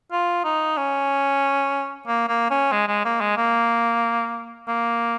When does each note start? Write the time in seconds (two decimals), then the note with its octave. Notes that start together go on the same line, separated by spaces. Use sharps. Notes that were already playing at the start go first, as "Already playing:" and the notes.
0.12 F4
0.44 D#4
0.77 C#4
2.07 A#3
2.28 A#3
2.51 C#4
2.72 G#3
2.88 G#3
3.05 A#3
3.21 G#3
3.37 A#3
4.68 A#3